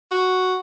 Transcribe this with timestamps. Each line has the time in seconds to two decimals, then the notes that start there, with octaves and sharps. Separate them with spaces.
0.11 F#4